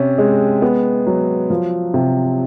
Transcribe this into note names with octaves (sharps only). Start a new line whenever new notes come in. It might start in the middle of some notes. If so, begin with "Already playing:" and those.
Already playing: C3 C#4
G#3
B3
F#3
F3
C3